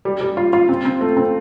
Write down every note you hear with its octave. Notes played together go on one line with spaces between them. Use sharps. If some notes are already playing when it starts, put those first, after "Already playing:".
G3
G3
F4
F4
C4
C4
A3
C4